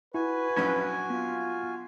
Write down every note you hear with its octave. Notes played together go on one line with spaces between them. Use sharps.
E4 F#4 B4 G#5
A#1 F#2 C#4 G#6
B3 F4